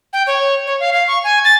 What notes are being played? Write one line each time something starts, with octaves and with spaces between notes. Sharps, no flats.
G5
C#5
C#5
F5
F5
C#6
G#5
A6